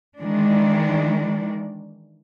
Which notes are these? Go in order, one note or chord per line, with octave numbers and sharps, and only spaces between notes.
D#3 E3 G#3 D4